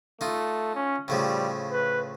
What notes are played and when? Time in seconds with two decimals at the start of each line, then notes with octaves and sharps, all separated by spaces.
0.21 A3 D#4 F4
0.75 C#4
1.08 A2 C#3 F3 G3
1.71 B4